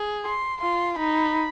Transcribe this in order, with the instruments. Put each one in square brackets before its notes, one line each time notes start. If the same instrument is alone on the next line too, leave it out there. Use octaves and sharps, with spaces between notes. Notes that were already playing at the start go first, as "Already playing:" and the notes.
Already playing: [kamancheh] G#4
[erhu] C6
[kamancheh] F4 [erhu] C6
[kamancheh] D#4 [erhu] B5